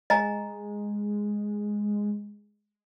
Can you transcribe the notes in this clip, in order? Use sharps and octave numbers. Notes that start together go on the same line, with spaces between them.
G#3 D#5 G#5 A#5